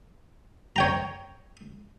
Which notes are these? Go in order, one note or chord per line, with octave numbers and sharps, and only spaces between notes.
C#5 G5 A#5